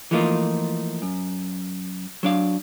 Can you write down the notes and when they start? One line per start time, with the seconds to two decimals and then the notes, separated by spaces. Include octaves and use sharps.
0.11 E3 F3 A3 A#3 D#4 F4
1.02 F#2
2.23 F#3 D4 F5